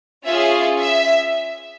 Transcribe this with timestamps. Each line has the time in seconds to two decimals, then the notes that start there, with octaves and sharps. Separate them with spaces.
0.25 C#4 F4 G#4 E5
0.80 E5